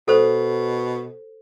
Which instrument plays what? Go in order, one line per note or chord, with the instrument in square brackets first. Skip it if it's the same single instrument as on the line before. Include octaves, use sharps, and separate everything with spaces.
[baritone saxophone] B2 [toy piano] A4 C5